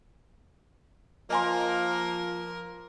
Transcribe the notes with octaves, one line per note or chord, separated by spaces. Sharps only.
F3 A#3 A#4 D#5 G#5 C6